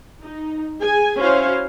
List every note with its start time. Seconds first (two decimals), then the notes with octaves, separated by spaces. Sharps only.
0.23 D#4
0.81 G#4 G#5
1.18 C#4 E4 F#4 C5 C#5 F5